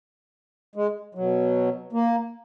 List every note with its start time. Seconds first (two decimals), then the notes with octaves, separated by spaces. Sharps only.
0.75 G#3
1.15 B2 F#3
1.93 A#3